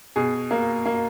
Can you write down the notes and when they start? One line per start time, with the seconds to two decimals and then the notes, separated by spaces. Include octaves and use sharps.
0.16 B2 G#4
0.51 A#3
0.86 A#3